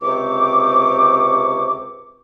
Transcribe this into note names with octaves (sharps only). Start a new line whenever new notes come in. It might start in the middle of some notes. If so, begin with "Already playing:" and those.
C#2 C3 C4 C#6 D6